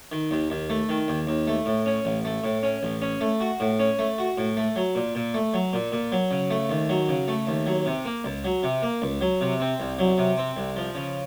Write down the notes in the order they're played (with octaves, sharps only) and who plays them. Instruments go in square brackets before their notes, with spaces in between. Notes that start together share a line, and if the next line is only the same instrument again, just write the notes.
[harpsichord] D#3
D#2
D#2
A3
D#3
D#2
D#2
A3
A2
C#4
A1
A3
A2
C#4
A1
C#4
A3
F#4
A2
C#4
A3
F#4
A2
A3
F#3
A#2
A#2
A3
F#3
A#2
A#2
F#3
C#3
A3
D#2
F#3
C#3
A3
D#2
F#3
C3
A#3
C#2
F#3
C3
A#3
C#2
F#3
C3
C4
C2
F#3
C3
C4
C2
F3
C#3